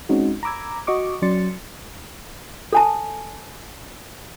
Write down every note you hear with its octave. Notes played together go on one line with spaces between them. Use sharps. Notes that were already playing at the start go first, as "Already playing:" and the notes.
G#3 C4 C#4 D#4 F#4
A#5 B5 D6 E6 G#6
F#4 D#5 C#6 D6
F#3 C#4 D5 C6 A6 C#7
A4 G#5 A5